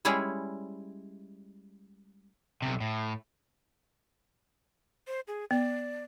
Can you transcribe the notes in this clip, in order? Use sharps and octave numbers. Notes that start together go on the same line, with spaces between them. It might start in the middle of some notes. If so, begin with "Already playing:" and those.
G3 G#3 C#4 E4 G#4
B1 C3
A2
C5
G#4
B3 D5